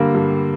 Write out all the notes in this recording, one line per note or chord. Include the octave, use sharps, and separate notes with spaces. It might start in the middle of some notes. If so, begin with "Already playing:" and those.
Already playing: G2 D3 G3 A#3
G2